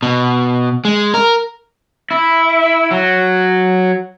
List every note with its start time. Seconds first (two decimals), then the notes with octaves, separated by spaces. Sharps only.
0.03 B2
0.85 G#3
1.14 A#4
2.11 E4
2.91 F#3